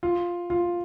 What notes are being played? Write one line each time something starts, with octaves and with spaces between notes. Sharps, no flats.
F4
F4